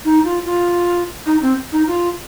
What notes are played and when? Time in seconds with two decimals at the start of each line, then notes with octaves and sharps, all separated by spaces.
0.05 D#4
0.25 F4
0.45 F4
1.26 D#4
1.42 C4
1.72 D#4
1.87 F4